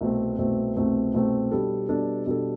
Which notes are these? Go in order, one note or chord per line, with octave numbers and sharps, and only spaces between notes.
C2 B2 A3 C4
C2 B2 A3 C4
C2 B2 A3 C4
C2 B2 A3 C4
B2 G3 D4 A4
B2 G3 D4 A4
B2 G3 D4 A4